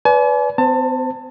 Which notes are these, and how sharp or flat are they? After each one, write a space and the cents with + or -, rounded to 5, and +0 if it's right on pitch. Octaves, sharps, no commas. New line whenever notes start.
B4 +5 D5 -30 G#5 +45
C4 -45 C5 +0 A5 +25